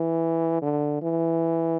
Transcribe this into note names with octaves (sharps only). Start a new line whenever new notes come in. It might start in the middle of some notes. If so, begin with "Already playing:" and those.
Already playing: E3
D3
E3